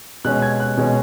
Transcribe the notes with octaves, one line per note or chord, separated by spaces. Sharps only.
B2 G#3 C#4 F#6
G#6
F#6
B2 G#3 C#4